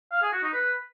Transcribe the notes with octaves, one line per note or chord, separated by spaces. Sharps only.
F5
G#4
F#4
D#4
B4